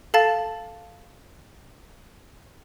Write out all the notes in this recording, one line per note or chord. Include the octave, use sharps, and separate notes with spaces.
A4 F5 A5 A6